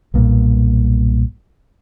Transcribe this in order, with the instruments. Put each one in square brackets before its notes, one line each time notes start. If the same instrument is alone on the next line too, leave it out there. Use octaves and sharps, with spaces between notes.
[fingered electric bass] B1 G2 A#2